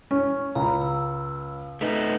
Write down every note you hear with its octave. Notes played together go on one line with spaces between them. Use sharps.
C#4 C#6
C#2 A#5 B5
E6
A3 D#4 B4